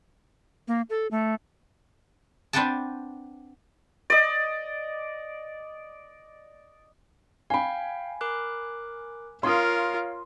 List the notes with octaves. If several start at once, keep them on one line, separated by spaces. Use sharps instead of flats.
A#3
A4
A3
C4 D4 B4 F#5 G5 A5
D5 D#5
F5 G5 G#5 B5
A#4 D6 F#6
F4 A#4 C#5 F5 C6 D#6